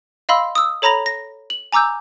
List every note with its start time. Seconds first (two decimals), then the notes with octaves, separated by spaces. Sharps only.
0.29 D#5 F5 B5 C6 E6
0.55 D#6 E6
0.82 A4 C#5 A#5 B5 A#6 F7
1.06 A#6
1.50 F#7
1.72 G#5 A#5 D6 E6 G6